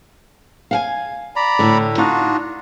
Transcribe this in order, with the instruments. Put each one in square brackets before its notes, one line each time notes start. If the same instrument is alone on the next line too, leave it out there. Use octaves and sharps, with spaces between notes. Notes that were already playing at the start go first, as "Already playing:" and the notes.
[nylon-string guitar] F5 F#5 G#5
[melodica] D5 A#5 B5
[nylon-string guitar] A2 D3
[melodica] D4 F4 F#4 [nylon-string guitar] D#4